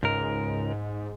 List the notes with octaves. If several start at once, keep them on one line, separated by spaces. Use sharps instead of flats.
C#2 G#2 A#4